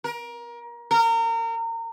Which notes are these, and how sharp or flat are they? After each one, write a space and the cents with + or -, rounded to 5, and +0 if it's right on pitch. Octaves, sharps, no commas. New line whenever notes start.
A#4 +25
A#4 -30